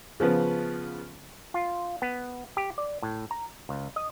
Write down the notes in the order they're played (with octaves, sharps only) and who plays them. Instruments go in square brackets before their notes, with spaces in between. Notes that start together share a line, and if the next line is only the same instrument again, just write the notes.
[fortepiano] C#3 F3 B3
[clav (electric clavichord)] F4
B3
G4
D5
A2
A#5
C#2
D#5